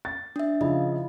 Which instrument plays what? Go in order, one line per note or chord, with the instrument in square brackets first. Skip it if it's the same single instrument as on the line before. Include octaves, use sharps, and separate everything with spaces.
[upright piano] A6
[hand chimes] D4 E5
[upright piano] C#3 F3 E4 [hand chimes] D#5